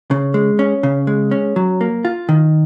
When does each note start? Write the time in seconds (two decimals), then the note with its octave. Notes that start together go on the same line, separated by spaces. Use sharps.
0.11 C#3
0.34 G#3
0.59 C#4
0.83 C#3
1.07 G#3
1.31 C#4
1.56 F#3
1.81 A#3
2.05 F4
2.29 D#3